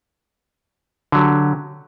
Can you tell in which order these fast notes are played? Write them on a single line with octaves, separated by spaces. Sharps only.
D3 F#3 G4